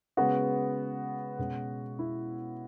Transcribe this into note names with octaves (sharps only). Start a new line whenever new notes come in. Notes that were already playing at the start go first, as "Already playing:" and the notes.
C#3 G#3 B3 F#4
B2 G#3 C#4
E4